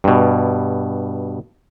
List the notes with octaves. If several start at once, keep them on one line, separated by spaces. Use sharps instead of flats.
G2 B2